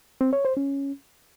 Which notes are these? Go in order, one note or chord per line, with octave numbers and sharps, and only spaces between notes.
C4
C#5
C5
C#4